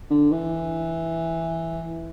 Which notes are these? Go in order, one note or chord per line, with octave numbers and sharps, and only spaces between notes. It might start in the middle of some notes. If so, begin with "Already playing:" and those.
D3
E3